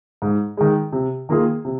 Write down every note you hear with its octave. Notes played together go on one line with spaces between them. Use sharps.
G#2
D#3 G#3
C3
D#3 A#3 F4 G#4
C3